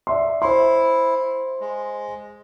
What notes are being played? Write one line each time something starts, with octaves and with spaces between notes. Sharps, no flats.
D5 E5 C6
E4 C5 C6
G#3